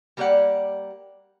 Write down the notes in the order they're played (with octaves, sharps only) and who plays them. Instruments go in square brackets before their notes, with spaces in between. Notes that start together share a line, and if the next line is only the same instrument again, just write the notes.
[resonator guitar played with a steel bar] G3 A#3 G4 A#4 D5 F#5